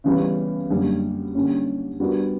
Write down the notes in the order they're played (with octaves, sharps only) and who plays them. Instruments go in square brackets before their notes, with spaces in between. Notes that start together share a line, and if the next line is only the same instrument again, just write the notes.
[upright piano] C#3 E3 G3 B3
F#2 D3 G3 A#3
D3 G3 A#3 C#4
G3 B3 D4 F#4 A#4